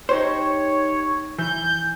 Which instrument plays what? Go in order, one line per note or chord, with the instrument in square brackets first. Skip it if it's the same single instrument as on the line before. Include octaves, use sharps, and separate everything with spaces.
[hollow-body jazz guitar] D#4 G4 C5 [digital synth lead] C#5
[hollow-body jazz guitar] E3 [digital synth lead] G6